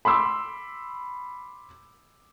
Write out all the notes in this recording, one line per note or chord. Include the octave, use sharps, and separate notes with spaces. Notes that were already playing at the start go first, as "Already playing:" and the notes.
B5 C6 D6 E6